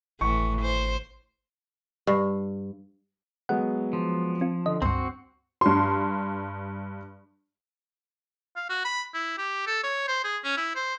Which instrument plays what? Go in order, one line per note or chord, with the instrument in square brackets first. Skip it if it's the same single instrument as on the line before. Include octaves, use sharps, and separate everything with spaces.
[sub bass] G#1 [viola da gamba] A2 E3 [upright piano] C#6
[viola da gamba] C5
[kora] G2
[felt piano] F#3 G#3 B3 [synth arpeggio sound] F#5
[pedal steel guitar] F3
[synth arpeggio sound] C4 F4
[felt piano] D3 [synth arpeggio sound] D#5
[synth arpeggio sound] C#2 G2 [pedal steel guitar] C4 F#4 [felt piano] C6
[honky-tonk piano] G2 C6
[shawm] F5
F#4
B5
E4
G4
A4
C#5
C5
G#4
C#4
E4
C5